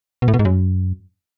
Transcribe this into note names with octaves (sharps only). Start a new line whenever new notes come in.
B2
A2
B2
G#2
F#2